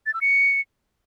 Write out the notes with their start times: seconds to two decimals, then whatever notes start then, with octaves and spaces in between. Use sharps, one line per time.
0.06 A6
0.14 E6
0.21 C#7